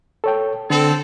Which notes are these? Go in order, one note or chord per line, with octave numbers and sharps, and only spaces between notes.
A4 C#5 G5
D3 C4 A4